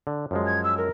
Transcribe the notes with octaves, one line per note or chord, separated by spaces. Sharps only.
D3
F#2 F3 G#3
G#6
E6
A#4